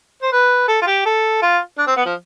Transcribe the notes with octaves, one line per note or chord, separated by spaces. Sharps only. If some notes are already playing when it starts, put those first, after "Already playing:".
C5
B4
A4
F4
G4
A4
F4
D4
C4
B3
F3